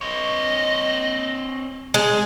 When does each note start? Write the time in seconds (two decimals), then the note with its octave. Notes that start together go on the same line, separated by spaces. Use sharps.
0.01 C4 C#5 D#5
1.94 G#3 G#4